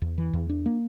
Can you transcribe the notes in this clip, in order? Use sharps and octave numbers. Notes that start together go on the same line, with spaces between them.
E2
E3
E2
D4
A#3